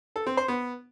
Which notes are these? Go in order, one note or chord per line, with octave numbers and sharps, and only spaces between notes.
A4
C4
C5
B3